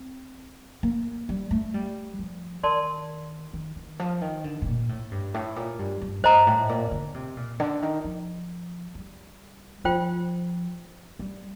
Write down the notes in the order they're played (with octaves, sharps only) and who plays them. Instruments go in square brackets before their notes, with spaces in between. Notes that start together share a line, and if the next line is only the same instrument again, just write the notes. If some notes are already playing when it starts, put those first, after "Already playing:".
Already playing: [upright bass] C4
A#3
G3
A3
G3
F3
[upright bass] D#3 [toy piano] A#4 D5 A5 C6
[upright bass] D#3
D#3
F3
D#3
D3
A2
A#2
A2
G2
A2
A#2
G2
G2
[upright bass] G2 [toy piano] C5 D#5 A#5
[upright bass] A2
A#2
D3
C3
A#2
D3
D#3
F3
G3
[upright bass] F3 [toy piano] F4 C5 G5
[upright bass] G3